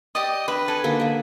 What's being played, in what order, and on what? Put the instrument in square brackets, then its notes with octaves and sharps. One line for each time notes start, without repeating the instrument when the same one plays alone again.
[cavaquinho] G4 D5 D#6 [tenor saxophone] D#5
[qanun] D4 [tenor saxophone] B4 [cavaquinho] B5
[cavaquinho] A4 [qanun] G#5
[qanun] D3 A#3 D#4
A#3 D4